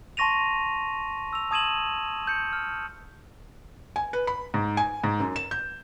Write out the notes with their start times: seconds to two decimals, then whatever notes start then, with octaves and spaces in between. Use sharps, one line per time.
0.17 A5 C6 C#6 A#6 D#7 F7
1.33 E6 F7
1.51 A5 D#6 G#6 D#7 E7 F#7
2.27 G6 C#7
2.53 F6
3.96 G#5
4.13 B4
4.27 B5
4.54 G#2
4.77 G#5
5.04 G#2
5.20 F#2
5.36 E7
5.51 G6